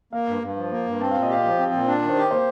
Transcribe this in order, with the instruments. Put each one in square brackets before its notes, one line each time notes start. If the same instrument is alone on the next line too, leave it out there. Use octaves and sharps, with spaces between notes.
[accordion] A#3 [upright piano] F5
[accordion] G2
G2
F3
A#3
G2
[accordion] C4 [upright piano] A5
[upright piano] F5
[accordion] A#2
[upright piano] D#5
[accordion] G4 [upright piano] F5
[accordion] F3 [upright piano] F5
[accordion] C4
A#2
D4
D#3
[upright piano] C5
[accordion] G4
[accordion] A#3 [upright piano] C5